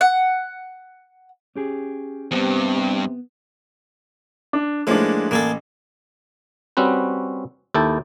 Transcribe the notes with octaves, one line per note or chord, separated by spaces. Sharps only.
F#5
C#4 G4 G#4
E2 G2 C3 B3 C4
D4
A2 F3 G#3 A#3 D4
A1 A#3 G#4 A4
G3 C4 C#4 F#4 B4
D#2 E4 A4 G5 A5